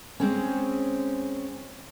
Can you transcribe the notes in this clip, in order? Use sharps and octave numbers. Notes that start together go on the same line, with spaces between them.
G#3 C4 C#4